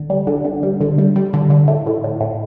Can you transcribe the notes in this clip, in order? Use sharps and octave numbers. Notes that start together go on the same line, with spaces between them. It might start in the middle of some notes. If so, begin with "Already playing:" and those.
Already playing: D3
G3
D3
D3
G3
D3
G3
G3
D3
D3
A2
A2
A2
A2